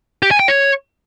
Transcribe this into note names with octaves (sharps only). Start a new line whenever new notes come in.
G4
G#5
G5
C#5